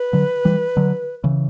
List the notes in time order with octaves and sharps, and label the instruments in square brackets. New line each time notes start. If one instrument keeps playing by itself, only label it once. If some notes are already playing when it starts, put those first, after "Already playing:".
Already playing: [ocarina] B4
[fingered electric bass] D3 F#3
E3 G3
D3 F#3
C#3 E3